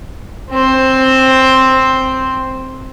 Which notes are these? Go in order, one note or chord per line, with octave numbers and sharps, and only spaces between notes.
C4 C5